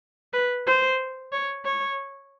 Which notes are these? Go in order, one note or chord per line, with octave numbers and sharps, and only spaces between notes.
B4
C5
C#5
C#5